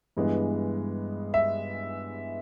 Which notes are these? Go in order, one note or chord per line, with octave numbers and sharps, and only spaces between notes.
G2 E3 G#3 B3
E5